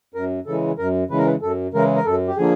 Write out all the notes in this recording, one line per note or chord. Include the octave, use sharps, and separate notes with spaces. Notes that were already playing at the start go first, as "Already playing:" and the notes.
F#2 A#4
C#3 E3 G#3 A4
F#2 A#4
C#3 E3 G#3 B4
A#4
B4
F#2 A4
C#3 E3 G#3 A#4
A#4
F#2 A4
G4
D3 F3 A#3 G#4